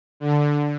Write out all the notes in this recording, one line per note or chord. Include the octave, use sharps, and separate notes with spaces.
D3